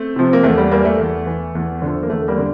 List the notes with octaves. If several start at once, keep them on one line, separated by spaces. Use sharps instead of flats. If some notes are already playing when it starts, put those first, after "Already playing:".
Already playing: A3 C4
C3 F3
A#3
E2 A3
G3
E3 G3 A#3
A3
E2
E3
E2
D3 F3
A#3
E2 A3
G3 A#3
D3